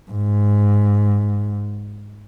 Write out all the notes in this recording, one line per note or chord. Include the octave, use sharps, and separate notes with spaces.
G#2